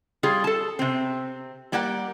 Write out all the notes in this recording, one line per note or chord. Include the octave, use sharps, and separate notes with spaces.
G3 F4 G#4
A4 A5
C3 C4
G3 A#3 G4 D5 F#5